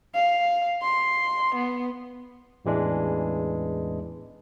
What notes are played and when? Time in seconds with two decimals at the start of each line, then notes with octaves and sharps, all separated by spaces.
0.15 F5
0.83 C6
1.56 B3
2.65 A1 E2 E3 G#3 D4